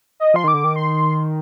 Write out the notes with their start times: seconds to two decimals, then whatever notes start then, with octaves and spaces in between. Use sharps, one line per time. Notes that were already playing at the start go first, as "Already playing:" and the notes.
0.20 D#5
0.34 F3 C6
0.44 D#3 D6
0.54 D3
0.64 D#3
0.76 C6